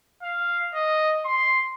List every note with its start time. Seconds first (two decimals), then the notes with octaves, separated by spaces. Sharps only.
0.22 F5
0.75 D#5
1.25 C6